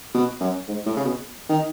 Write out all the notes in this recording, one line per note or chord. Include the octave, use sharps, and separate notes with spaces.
B2
F#2
G#2
A2
C#3
B2
D#3